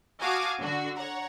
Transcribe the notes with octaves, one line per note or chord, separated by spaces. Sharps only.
F#4 F5 G#5 A5 D6 D#6
D3 F#4
C#5 F#5 A#5